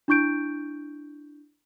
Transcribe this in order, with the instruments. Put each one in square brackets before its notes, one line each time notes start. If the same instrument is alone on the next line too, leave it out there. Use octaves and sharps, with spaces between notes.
[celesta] D4 E4 C#6 G6 D7